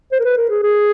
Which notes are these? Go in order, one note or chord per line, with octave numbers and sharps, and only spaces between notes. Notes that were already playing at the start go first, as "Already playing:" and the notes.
C5
A#4
B4
A#4
G#4
G#4